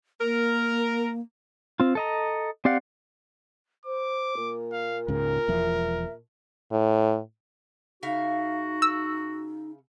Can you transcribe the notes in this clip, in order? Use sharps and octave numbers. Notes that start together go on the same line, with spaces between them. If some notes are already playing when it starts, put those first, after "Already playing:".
A#3 A#4
C4 F4
A4 D#5 A#5
C4 G4 D5 F5 F#5
C5 D6
A#2 A#3
F5
C#2 G#2 C#3 A#4
E1 E2 F3 E5
A2
C#3 D#4 F#4 E5 F5
E6